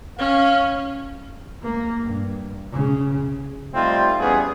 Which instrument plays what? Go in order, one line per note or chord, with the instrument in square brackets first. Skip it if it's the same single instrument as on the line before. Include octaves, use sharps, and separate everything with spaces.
[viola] C#4 [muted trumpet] F5
[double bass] A#3
G2
C#3
[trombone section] G3 A3 C4 D#4 F4
E2 G3 B3 C#4 G#4